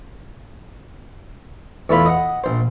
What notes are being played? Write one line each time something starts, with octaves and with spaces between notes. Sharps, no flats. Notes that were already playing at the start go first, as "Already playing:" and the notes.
E2 A3 E4 F4 B5
D#5 F#5
A#1 C5